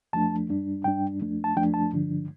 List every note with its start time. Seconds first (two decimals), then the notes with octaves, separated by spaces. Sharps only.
0.13 F2 F3 A3 D4 A5
0.49 G2 G3 D4
0.84 G2 G3 D4 G5
1.20 F2 F3 A3 D4
1.44 A5
1.56 F2 F3 A3 D4 G5
1.74 A5
1.92 G2 D3 F3 D4